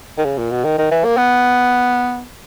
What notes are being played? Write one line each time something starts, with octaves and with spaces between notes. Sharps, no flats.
D#3
C#3
A#2
B2
D#3
D#3
E3
A#3
B3